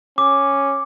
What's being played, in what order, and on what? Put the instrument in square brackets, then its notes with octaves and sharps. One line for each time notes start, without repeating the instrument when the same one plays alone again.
[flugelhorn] C#4 [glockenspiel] D6